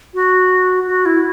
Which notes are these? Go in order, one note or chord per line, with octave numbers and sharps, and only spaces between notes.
F#4
F#4
E4